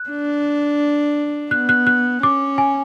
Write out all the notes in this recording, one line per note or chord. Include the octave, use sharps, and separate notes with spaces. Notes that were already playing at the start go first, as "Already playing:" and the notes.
Already playing: F#6
D4
B3 F#6
F#6
F#6
C#4 D6
G#5